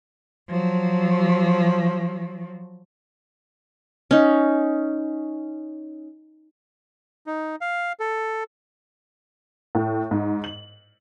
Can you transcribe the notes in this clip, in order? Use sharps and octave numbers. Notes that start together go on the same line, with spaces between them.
F3 F#3
C#4 D#4
D#4
F5
A4
A2
G#2
F#7